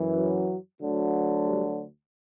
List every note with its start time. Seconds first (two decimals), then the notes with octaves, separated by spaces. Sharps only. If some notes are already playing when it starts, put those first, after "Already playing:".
Already playing: F#2 E3
0.16 F#3
0.81 D2 D3 F#3
1.45 G3